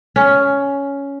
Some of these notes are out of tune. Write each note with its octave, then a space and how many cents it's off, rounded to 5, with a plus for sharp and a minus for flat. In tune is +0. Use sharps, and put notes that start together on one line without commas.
C#4 +10